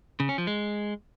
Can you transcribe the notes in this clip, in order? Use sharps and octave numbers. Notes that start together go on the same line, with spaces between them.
C#3
C#4
F3
G#3